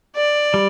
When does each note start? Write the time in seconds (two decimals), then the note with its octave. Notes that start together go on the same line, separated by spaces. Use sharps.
0.16 D5
0.54 G3